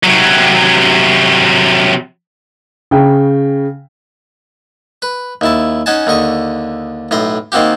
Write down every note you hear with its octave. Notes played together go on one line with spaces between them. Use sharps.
C3 F#3
C#3 G5
B4
D#2 E4 A5
C#4 D#4 F#5 G#5 A5
D#2 D3 D#5 C#6
B1 A2 A#5 C6
D#3 A#3 C4 F#4 G4